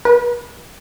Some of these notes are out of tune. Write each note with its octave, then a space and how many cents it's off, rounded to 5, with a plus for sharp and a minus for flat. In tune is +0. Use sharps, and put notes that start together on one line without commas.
B4 -30